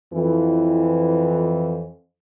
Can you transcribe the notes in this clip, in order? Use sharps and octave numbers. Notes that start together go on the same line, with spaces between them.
F2 E3